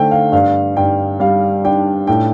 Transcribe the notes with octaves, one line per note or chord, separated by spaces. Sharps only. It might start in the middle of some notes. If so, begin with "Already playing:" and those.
Already playing: D3 A3 C5 G5
F5
G2 F5
G2 G5
G3 F5
D4 G5
A2 G5